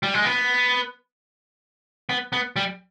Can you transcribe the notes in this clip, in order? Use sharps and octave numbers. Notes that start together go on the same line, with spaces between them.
G3
G#3
B3
B3
B3
G3